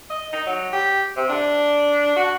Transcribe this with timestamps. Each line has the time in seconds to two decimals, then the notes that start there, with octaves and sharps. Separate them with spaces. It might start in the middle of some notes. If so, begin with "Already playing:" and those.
0.10 D#5
0.33 D#4
0.47 F#3
0.72 G4
1.17 C3
1.29 D4
2.16 F#4